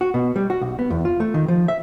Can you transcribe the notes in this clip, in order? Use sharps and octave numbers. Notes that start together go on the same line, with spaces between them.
F#4
B2
G3
F#4
B1
B3
E2
F4
A3
D#3
F3
E5